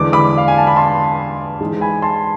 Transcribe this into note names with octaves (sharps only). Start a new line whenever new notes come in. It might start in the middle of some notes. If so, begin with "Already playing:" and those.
Already playing: E2 D3 G#3 D4 D6
B5 D6
F5
G#5
A5
B5
A5 C6
G#2 E3 G#3
G#5 B5
A5 C6